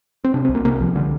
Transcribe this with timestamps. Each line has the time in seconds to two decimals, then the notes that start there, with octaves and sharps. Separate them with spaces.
0.24 C4
0.34 C3 D4
0.45 C2 C4
0.55 A#3
0.65 C3 A#3
0.80 C2 F3
0.96 D3 G3